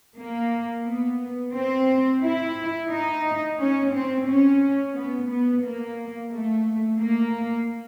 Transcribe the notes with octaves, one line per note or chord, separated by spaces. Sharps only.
A#3
B3
C4
E4
D#4
C#4
C4
C#4
B3
B3
A#3
A3
A#3